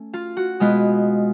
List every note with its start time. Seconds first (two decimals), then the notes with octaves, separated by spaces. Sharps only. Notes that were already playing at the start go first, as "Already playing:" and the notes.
Already playing: A3 C#4
0.13 F4
0.37 F#4
0.60 B2 G#3 B3 F4